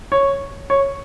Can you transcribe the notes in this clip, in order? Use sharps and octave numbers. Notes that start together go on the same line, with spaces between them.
C#5
C#5